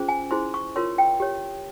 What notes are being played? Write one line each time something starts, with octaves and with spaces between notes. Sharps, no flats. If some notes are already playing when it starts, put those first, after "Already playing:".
Already playing: C#4 F4 G#4 C5
G#5
E4 G#4 C5 C6
C#6
F4 A#4 C#5 C6
G5
G4 C#5